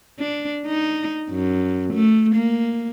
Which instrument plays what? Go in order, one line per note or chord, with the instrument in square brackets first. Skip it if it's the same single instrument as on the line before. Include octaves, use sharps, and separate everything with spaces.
[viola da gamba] D4
D#4
F#2
A3
A#3